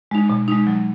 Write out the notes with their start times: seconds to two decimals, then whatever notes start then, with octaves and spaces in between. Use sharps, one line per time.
0.11 G#3 D#4
0.30 B2
0.48 G#3 D#4
0.67 F#3